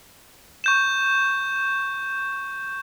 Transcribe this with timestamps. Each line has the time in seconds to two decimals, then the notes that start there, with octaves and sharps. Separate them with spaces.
0.64 C#6 G6 E7